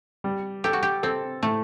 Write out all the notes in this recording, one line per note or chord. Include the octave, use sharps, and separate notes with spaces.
G3
G4 A4
F#4
G4
C4 A4
A2 A3